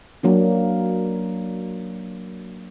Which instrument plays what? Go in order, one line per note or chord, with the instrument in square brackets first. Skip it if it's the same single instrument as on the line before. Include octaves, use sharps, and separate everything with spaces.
[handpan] F#3 A#3 D4